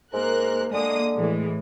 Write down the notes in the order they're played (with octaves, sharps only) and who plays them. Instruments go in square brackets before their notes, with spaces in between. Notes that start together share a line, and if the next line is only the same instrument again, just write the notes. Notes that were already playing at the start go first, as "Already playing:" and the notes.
[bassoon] G#2 [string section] A#3 A#4 F#6
[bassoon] D3 [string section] G#3 A#3 D#6
[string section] A2 E3 G#3